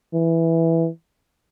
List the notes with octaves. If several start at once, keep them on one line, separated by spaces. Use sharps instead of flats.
E3